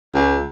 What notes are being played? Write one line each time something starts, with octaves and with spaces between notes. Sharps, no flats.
C#2